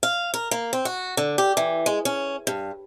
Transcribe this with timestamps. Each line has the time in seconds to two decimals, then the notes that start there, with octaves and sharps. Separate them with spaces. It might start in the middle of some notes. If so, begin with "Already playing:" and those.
0.03 F5
0.34 A#4
0.51 A#3
0.73 C4
0.85 F#4
1.17 D3
1.38 G4
1.57 E3
1.86 G#3
2.05 C#4
2.47 G2